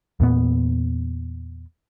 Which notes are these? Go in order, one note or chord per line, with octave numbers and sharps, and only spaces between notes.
E2 A#2 B3